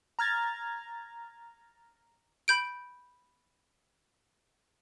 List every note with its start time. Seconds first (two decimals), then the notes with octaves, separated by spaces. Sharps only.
0.19 A#5 F6 G#6 A6
2.48 B5 G6 D7